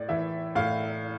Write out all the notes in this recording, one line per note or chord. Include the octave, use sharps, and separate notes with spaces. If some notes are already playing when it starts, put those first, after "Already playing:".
Already playing: A2 D5
E3 E5
A2 F5